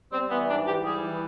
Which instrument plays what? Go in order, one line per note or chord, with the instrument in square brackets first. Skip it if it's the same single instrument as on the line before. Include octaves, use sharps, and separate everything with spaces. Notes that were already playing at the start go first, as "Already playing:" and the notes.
[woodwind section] G3 C4
E3 B3
G#2 D4
E3 G4
G3 G#4
E3